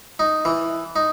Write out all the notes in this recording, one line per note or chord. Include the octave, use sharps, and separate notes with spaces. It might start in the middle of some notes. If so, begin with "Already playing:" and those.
D#4
E3
D#4